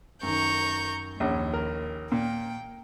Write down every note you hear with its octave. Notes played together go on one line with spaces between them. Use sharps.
F#2 D#3 A#5 C#6 G6
A#1 D#2 C#4
A#4
A#2 G5